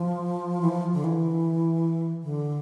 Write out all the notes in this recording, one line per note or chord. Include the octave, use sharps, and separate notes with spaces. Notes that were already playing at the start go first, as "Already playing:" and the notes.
Already playing: F3
E3
F3
D3
E3
D3